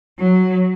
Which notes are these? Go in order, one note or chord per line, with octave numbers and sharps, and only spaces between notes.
F#3